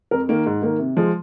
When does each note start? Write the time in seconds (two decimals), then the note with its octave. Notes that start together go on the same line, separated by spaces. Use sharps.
0.11 F2 A#4
0.29 D#3 A#3
0.46 G#2
0.62 D#3 A#3
0.79 C3
0.97 F3 G#3